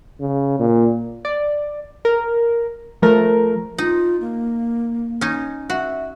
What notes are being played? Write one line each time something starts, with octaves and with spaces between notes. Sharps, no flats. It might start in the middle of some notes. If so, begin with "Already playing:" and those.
C#3
A#2
D5
A#4
F3 A3 A#4
D#4 F4
A#3
C#4 D#4
F#4 E5